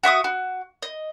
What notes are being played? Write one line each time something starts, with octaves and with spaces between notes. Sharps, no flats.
F#4 E5 C#6 D#6
F#4
D#5